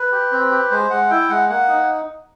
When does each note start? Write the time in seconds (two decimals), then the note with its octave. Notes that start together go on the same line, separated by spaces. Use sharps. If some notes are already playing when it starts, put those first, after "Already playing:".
Already playing: B4
0.12 G4
0.32 C4
0.51 G4
0.71 G#3 C5
0.90 G#3 F#5
1.10 E4 G5
1.30 G#3 F#5
1.49 A#3 F#5
1.68 D#4